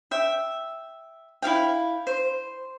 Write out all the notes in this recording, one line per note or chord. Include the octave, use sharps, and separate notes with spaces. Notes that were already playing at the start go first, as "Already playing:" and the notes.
E5 G5
E4 F4 F5 G5
C5